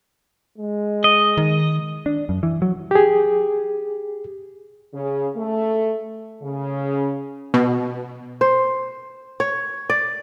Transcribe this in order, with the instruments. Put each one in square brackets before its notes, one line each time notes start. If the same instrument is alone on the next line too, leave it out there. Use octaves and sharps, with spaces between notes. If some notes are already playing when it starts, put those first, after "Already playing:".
[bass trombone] G#3
[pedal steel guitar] D#5
[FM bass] D#3
[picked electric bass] D4
F#2
E3
F#3
[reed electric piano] G4 G#4
[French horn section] C#3
A3
C#3
[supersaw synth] B2
[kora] C5
C#5
D5